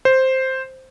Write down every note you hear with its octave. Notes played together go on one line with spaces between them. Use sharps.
C5